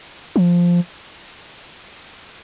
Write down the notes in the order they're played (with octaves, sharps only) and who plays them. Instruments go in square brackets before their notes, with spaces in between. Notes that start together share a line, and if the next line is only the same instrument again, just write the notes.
[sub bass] F3